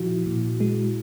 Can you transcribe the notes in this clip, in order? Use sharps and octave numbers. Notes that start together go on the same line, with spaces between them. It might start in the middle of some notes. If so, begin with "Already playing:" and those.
Already playing: A#2 F3 E4 F#4
A#2
G#3